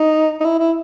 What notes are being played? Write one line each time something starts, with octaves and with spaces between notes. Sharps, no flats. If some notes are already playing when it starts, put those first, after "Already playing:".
Already playing: D#4
D#4
E4
E4